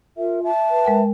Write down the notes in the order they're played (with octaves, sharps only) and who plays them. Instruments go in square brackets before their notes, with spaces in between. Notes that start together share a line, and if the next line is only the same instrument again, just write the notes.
[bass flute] F4 [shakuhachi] A#4 [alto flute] E5
[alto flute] E5 [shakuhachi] A5
[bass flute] B4
[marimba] G#3 A#4 G5